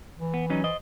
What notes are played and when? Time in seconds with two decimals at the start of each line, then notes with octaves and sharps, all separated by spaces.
0.19 E3
0.34 B3
0.50 F#3 C#4 D#4
0.64 C5 D#5